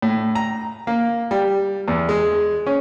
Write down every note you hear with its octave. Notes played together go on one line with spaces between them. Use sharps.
A2
A#5
A#3
G3
E2
G#3
C#4